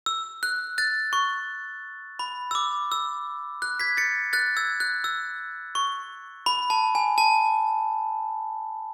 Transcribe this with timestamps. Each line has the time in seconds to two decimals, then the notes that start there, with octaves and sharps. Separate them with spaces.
0.06 E6
0.43 F#6
0.78 F#6 A6
1.13 C#6
2.19 B5
2.51 E6
2.55 D6
2.92 E6
3.62 F#6
3.80 G#6 B6
3.97 A6 C#7
4.33 F#6 A6
4.57 E6 G#6
4.80 F#6
5.04 E6
5.75 C#6
6.46 B5
6.70 A5
6.95 G#5
7.18 A5